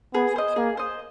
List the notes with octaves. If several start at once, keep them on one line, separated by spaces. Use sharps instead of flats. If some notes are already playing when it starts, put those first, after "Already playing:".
B3 G#4
C5 D#5
A#3 G#4
C5 D#5